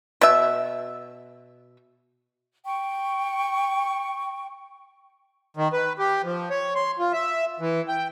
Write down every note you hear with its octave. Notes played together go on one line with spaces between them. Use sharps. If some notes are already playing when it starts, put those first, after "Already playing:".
B2 E5
G5 C#6
D#3
B4
G4
F3
C#5
C6
F4
E5
E3
G5